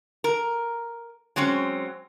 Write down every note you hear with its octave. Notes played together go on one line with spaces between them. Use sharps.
A#4
F#3 G#3 C4 C#4